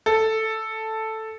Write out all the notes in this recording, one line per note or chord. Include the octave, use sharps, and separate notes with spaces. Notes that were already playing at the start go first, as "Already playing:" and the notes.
A4